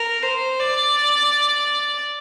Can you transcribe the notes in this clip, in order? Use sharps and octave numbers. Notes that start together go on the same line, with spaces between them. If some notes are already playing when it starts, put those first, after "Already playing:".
Already playing: A#4
C5
D5